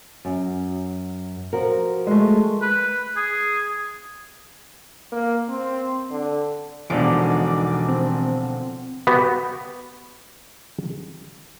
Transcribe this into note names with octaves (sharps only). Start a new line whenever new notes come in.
F#2
F3 F#4 A#4
G#3 A3
B4
G#4
A#3
C4
D3
E1 B2 D3 F3 D4 D#4 D6
C4
B3 F#4 G4